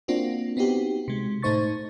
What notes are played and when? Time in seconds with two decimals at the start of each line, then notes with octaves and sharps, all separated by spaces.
0.08 A#3 C4 D4 F4 F#4
0.57 B3 C4 D#4 F#4 G4
1.08 C3 G#3
1.42 A2 A3 D#4 C5 C#6 A6